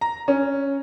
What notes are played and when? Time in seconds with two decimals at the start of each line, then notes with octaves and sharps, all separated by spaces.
0.01 A#5
0.28 C#4